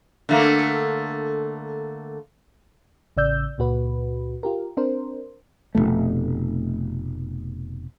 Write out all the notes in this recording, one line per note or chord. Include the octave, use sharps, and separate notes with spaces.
D3 A3 A#3
A1 C#3 D5 E6 G6
C#2 A#2 F#4 B4
F4 G4 A#4
C4 D4 A#4 C5
F1 D#2 B2 A3